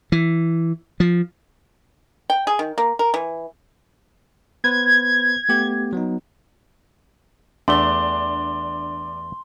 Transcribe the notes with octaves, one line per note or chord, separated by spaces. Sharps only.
E3
F3
G5
G#4
D#3
A#3
A#4
E3
B3 B4 C5 G#6
A3 B3 G4
F#3 B3 D#4
E2 A3 D4 C6 G7